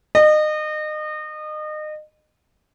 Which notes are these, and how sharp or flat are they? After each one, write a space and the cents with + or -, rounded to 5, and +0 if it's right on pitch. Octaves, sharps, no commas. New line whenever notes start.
D#5 -30